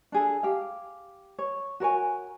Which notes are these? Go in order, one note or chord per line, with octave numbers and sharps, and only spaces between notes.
D4 G#4 A4
G4 F5
C#5
F#4 A#4 C#5 G#5